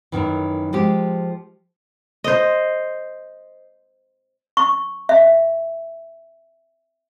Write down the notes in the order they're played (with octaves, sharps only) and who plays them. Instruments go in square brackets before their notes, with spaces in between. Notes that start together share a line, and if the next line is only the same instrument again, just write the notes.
[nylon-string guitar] F#2 A2 D#3 E3
F3 G#3 G4
[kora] C5 D#5
[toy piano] C#6
E5